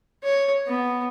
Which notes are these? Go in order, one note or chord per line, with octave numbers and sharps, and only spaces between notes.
C#5
B3